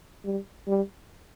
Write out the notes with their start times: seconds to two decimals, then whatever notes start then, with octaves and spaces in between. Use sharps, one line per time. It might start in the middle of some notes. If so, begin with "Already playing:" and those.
0.25 G3
0.67 G3